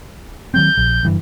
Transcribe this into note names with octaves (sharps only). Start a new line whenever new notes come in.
D#3 F#3 C4 G6
A#1
F#1 G2 E3